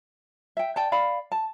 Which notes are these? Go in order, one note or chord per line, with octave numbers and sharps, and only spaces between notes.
E5 G5
D5 G5 A5
D5 F5 B5
A5